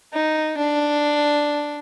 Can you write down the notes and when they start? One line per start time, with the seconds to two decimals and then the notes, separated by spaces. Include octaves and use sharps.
0.13 D#4
0.57 D4